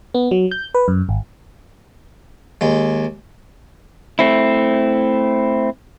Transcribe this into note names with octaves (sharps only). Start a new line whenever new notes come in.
B3
F#3
G6
B4
F#2
G#1
D#2 G#3
A3 C4 E4